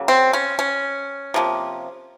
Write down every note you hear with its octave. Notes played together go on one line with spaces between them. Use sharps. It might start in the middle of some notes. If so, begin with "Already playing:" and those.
Already playing: C#3 F#3 A#3
C4
C#4
C#4
C3 F3 A#3